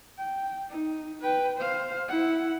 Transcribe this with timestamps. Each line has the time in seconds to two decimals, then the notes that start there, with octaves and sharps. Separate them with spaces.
0.18 G5
0.70 D#4
1.22 B4 G5
1.58 C5 F5
2.08 E4 F#5